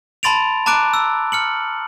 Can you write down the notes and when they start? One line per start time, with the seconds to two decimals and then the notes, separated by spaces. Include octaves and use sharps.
0.23 A5 B5 C6 A6 D7 F7
0.66 A5 A#5 D6 F#6 D7
0.94 E6
1.32 F6 C#7 F#7